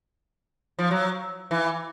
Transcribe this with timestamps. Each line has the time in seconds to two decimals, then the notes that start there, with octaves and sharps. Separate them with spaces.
0.79 F3
0.91 F#3
1.51 E3